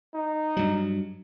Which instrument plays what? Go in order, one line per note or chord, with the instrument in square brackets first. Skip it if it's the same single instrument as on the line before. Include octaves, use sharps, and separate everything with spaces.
[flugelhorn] D#4
[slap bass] G2 F#3